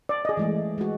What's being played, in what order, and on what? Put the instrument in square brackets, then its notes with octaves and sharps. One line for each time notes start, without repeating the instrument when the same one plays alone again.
[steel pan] D5
G#4 D#5
[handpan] E3 G#3 A3
G#3 F#4